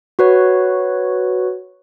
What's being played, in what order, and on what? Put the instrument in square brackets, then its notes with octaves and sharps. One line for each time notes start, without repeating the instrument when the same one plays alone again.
[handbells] F#4 B4 C#5